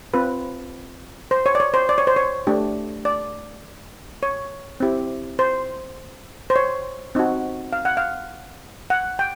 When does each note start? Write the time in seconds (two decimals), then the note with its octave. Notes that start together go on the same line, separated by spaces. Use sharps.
0.14 C4 F4 B4
1.31 C5
1.46 C#5
1.55 D5
1.60 C#5
1.74 C5
1.89 D5
1.98 C#5
2.07 C5
2.16 C#5
2.47 A3 D4 G4
3.05 D5
4.23 C#5
4.80 C4 E4 G4
5.39 C5
6.50 C5
6.56 C#5
7.15 C4 D#4 F#4
7.73 F5
7.85 F#5
7.97 F5
8.90 F#5
9.19 G5